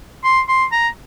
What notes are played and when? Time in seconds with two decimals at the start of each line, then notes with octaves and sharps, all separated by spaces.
0.24 C6
0.48 C6
0.72 A#5